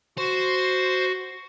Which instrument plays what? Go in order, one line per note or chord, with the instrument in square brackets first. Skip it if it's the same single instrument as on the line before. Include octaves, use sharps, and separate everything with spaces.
[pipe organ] F#4 [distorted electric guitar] C5